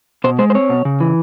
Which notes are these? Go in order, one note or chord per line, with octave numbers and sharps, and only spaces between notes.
B2 C5
G#3 C5
C5
C4 C#5
B2
C#3
E3